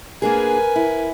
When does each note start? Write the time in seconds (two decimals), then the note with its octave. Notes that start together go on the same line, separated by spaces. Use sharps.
0.22 A#3 D4 G#4 A#4 B4 G#5
0.76 E4